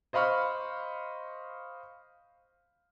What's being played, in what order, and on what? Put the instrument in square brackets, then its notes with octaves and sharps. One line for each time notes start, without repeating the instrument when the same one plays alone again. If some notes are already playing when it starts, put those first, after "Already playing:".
[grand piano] C5 D#5 F5 B5 C#6 F6